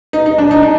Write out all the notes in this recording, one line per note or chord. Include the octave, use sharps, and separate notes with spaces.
D#4
D#4
D4
D#4
D4